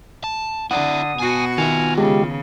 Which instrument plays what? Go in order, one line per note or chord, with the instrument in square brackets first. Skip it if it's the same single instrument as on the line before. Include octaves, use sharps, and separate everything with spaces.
[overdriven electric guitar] A5
[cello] D3 [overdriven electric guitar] E4 D5 [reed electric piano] F#5 [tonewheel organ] D#6
[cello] B2 F#4 [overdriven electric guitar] G5 G#5
[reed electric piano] D#3 B3 [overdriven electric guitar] F4 E5 [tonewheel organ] G#5 F6
[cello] C#3 [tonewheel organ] G#3 G4